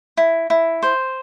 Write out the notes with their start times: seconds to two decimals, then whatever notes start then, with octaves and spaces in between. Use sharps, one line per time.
0.17 E4
0.50 E4
0.83 C5